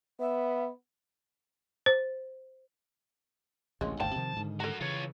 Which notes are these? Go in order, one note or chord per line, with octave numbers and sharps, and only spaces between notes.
B3 E5
C5
A1 D2 C3 G#3 A#3 C#4
G1 D2 G#2 C5 F5 G5 A5
C3 D#3 F3
G#2 D3 D#3
F#4 A4 A#4 A#5
C#3 E3 F4 C#5